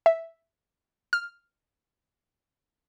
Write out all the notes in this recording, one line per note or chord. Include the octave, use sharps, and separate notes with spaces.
E5
F6